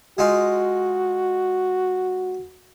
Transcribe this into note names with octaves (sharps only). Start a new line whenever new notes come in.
G#3 D#4 F4 F#4